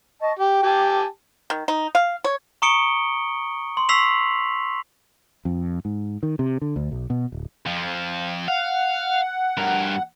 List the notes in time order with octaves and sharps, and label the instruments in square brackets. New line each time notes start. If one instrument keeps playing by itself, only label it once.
[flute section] D#5 A5 C#6
[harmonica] G4 [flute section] G5 D6
[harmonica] G4 G#5 A5
[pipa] D#3
D#4
F5
C#5
[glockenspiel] A#5 C#6 D#6 C#7 D7 G7
C6
C#6 E6 B6 C7 F7 F#7
[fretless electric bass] F2
G#2
D#3
C3
D3
D2
B1
B2
D1
[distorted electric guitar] F2 F3
[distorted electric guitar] F5 [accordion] F#5
[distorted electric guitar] G2 A#4